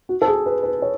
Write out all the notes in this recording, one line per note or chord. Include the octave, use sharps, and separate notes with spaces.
F#4
A4
G#4
B4
B4
C#5